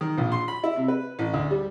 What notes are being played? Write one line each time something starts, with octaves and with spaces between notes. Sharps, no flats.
D#3
A#1
C6
B5
E4
C3
B4
A1
D2
G3